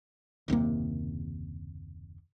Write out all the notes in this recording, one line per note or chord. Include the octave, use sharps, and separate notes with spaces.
F#1 D#2 C3 A#3